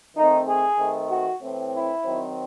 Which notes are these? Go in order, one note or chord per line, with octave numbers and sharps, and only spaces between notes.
D#3 A3 C4 D#4
G#4
D#3 A3 C4
F#4
A2 E3 C4
E4
D#3 F#3 C4